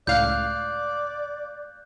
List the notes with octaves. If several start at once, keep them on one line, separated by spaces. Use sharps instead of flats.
C#2 A2 D5 F5 F#6 G6